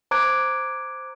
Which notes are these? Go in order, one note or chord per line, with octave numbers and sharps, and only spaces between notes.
C5 A#5 D6 F#6 G#6 D7